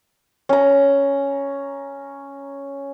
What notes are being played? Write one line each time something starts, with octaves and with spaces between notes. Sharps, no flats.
C#4 A#5